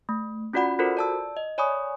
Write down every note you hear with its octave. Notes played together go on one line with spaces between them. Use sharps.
A3
C#4 F4 F#4 D5 F#5 B5
F4 F#4 A4 A#4 C5
D5 A5 E6
D#5
C#5 D5 G#5 B5 C#6 D#6